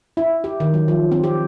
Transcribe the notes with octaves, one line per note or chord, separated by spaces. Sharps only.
E4
G4
D#3
F#3
F3
C4
G4